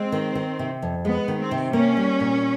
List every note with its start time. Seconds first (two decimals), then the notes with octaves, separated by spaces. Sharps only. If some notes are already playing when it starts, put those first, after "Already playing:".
Already playing: G#3 C4
0.12 D#3
0.35 D#3
0.59 C3
0.82 F2
1.04 G#3 B3
1.28 D#3
1.40 C4
1.51 C3
1.73 A#3 C#4
1.97 G3
2.20 A#2